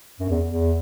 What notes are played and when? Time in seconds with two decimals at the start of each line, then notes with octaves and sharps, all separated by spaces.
0.20 F#2
0.29 E2
0.48 E2